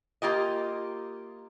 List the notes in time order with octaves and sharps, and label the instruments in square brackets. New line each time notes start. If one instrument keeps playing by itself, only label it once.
[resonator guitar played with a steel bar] A#3 F4 G4 D#5